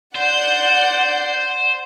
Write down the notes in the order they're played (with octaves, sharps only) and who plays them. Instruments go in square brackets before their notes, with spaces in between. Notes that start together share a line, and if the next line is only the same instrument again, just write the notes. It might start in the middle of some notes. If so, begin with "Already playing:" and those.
[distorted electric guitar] C5 [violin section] D5 F#5 G6